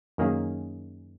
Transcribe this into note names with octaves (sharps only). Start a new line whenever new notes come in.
F#2 D#3 A#3 C#4 G#4